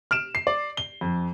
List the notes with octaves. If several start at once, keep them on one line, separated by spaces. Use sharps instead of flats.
F6 D7 E7
C7
D5
G7
F2